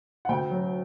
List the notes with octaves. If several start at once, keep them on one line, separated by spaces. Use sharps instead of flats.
F#5
D2 G5
F#3